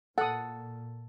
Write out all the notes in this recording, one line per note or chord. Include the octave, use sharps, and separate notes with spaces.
A#2 A4 F#5 D#6